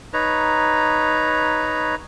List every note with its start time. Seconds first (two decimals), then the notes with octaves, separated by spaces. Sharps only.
0.13 D#4 B4 C#5 A#5